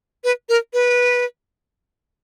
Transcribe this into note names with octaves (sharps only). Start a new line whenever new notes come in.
B4
A#4
B4